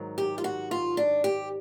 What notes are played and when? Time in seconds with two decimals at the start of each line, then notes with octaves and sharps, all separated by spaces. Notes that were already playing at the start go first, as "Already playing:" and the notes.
Already playing: G#2 D#3 F#3
0.18 G4
0.38 F4
0.44 F#4
0.71 F4
0.97 D4
1.24 G4